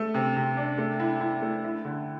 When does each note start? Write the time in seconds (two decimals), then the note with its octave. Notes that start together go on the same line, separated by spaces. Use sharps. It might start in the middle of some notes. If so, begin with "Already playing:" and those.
Already playing: A3
0.14 C3
0.36 C3
0.57 D4
0.78 A3
1.00 E4
1.21 E4
1.42 A3
1.64 E4
1.85 D3